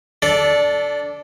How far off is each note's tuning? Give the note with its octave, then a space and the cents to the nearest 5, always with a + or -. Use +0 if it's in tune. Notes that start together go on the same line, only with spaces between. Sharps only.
D4 -25 A4 +0 D5 -5